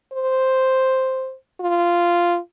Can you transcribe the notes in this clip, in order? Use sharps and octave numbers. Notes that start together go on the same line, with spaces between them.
C5
F4